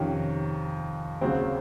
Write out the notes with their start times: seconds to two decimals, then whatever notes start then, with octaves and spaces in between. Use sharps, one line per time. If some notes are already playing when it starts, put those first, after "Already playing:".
Already playing: F2 C3 D#3 C#4
1.21 D#2 C#3 F#3 C4